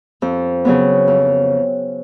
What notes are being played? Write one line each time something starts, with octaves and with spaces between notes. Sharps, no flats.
F2
C#3 F#3 B3
F2